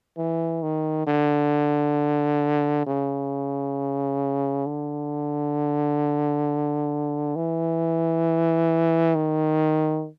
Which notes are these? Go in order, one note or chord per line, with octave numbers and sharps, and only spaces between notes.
E3
D#3
D3
C#3
D3
E3
D#3